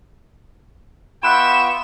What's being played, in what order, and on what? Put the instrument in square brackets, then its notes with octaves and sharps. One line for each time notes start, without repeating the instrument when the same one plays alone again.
[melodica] B3 F4 C#6 [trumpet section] E5 G5 [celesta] B5 F#6 [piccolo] E7